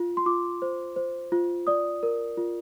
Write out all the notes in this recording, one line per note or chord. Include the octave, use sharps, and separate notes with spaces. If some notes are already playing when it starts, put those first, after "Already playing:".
Already playing: F4
C6
F4 D6
C5
C5
F4
D5 D#6
A#4
F4